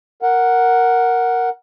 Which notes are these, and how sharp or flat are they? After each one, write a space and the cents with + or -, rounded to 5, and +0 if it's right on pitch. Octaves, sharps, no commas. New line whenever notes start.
A#4 +0 F#5 +0